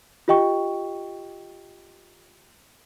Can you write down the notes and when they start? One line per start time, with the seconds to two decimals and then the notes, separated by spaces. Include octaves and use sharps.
0.28 F4 G4 D#5 G5 C#6